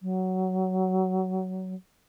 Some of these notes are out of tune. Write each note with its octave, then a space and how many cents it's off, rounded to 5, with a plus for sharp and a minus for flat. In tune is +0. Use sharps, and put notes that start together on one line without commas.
F#3 +15